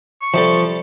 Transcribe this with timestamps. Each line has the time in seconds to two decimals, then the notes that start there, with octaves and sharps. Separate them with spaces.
0.22 C#6
0.34 C3 F3 G3 A4